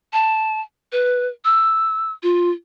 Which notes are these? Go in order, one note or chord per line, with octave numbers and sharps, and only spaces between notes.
A5
B4
E6
F4